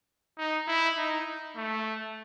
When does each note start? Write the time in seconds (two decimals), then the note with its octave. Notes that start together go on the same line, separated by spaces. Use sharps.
0.38 D#4
0.68 E4
0.98 D#4
1.57 A3